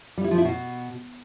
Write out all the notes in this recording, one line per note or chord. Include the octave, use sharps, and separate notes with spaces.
G3
E4
F3
E4
B2